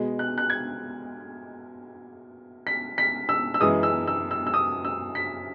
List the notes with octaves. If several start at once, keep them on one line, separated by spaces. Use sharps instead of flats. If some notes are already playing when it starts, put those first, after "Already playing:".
Already playing: B2 G#3
F#6
F#6
G#6
B6
B6
E6
E6
F#2 E3 G#3 D#6
E6
E6
E6
E6
D#6
E6
B6